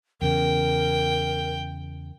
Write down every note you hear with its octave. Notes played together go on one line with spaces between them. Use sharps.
E2 C#3 A#4 G5